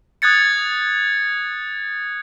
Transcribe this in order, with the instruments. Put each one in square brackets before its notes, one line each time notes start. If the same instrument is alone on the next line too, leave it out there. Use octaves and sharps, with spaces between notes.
[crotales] D#6 F#6 G#6 A6 C#7